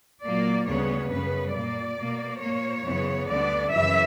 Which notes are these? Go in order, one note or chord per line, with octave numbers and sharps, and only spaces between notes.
A#2 F#3 A#3 D5
D2 C#3 G3 B3 C#5
F#2 C#3 G3 B3 B4
A#2 A#3 D5
B2 A#3
A#2 A#3 C#5
F#2 C#3 E3 B3
D2 D3 G3 B3 D5
F#2 C#3 E3 E5